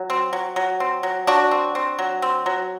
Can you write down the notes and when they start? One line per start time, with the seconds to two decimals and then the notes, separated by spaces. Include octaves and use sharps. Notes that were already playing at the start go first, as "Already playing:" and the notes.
Already playing: F#3
0.10 C4
0.33 F#3
0.56 F#3
0.80 C4
1.03 F#3
1.27 F#3 D4 F#4
1.51 C4
1.75 C4
1.99 F#3
2.22 C4
2.46 F#3